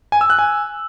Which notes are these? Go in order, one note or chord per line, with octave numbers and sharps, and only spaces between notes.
G#5
E6
F#6
G#5